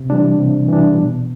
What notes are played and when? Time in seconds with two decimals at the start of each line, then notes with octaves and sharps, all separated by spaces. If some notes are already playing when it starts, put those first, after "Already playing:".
Already playing: C3
0.10 E3 G3 D4
0.39 C3
0.69 E3 G3 D4
0.98 B2